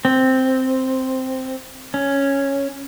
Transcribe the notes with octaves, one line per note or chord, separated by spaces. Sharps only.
C4
C#4